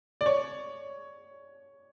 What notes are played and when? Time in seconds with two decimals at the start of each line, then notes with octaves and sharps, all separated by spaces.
0.21 D5
0.26 C#5